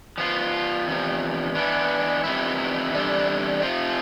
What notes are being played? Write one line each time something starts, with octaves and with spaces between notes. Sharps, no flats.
F3 B3 F4
E2 C3 F3
E3 B3 D4
F2 C3 E3 B3 E4
E2 C3 G3 D4 A4
C3 F3 C4 F4